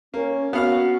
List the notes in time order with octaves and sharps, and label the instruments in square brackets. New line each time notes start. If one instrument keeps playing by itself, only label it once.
[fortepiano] A#3 [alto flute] C#4
[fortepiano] B3 F5 F6 [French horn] F#4